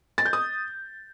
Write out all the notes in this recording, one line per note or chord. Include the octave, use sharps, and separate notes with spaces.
A6
G6
D#6